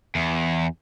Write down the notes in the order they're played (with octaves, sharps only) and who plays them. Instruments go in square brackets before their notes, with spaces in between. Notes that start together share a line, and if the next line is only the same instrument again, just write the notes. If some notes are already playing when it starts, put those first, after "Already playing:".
[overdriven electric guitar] E2